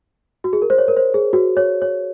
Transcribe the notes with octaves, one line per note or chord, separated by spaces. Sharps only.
F#4
G#4
A#4
C5
C#5
A#4
C5
G#4
F#4
C#5
C#5